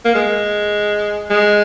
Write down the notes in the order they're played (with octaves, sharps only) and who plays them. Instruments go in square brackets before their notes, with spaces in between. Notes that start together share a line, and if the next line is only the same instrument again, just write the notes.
[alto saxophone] A#3
G#3
G#3